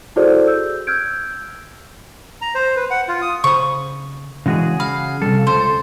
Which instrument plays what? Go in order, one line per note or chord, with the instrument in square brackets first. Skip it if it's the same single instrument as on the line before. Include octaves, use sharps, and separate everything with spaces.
[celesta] E4 F#4 G#4 A4 C5 D5
E6 G6
E6 F6 G6 G#6 D7
[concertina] A#5
C5
B4
F#5
F4
D#6
[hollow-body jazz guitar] C#3 C5 B5 [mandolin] C#6 D#6
[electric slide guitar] C#3 F#4 G#4 [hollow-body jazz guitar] E3 G#3
[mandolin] F5 [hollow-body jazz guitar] B5
[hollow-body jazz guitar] C3 D#3 G3 [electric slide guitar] A4
[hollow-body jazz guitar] C#2 [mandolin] C5